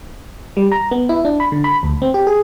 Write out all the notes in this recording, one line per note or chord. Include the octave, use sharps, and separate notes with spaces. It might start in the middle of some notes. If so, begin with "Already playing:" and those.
G3
A#5
B3
E4
D4
B5
D3
B5
D2
C4
G4
G#4